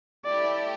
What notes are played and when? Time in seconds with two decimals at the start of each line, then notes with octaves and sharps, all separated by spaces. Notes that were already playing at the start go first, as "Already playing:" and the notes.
0.25 A3 E4 G4 D5